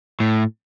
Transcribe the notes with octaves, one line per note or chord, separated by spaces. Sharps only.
A2